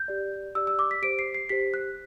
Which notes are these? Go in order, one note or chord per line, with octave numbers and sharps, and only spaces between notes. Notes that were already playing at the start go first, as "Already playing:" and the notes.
Already playing: G6
G4 D5
G4 D5 E6
E6
D6
B6
G4 C5 D7
C7
C7
G4 C5 B6
F#6